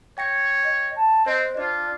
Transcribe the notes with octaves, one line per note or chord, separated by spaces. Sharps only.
C#5 G5 A#6 C#7
D#5
A5
C4 C5 D#5
D4 F4 D5